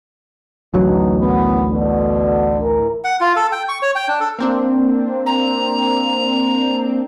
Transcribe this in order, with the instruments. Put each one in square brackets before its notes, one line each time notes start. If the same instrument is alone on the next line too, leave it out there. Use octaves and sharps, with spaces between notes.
[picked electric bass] A1 D2 F#3 [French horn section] B2 D#4
[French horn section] E2 D#3 B3
B2 D3
E3 A#4
[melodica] F#5
F4
A4
G5
C#6
C#5
G5
D4
A4
[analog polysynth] A#3 C4 D4
[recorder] A#5